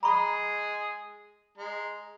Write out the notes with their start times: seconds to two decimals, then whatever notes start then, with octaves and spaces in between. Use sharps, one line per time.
0.03 G#3 G#4 A#5 B5 C#6
1.58 G#3 A#5